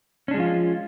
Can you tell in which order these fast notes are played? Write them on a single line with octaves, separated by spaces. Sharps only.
C#4 D4 G#3 F3 F4